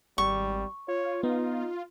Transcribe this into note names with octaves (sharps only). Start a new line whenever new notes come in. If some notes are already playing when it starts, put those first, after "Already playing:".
G#1 G3 C#6
F4 C#5
B3 D#4